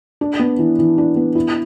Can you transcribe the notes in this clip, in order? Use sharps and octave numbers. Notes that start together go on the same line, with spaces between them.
D4
B3
E3
E3
D4
B3
E4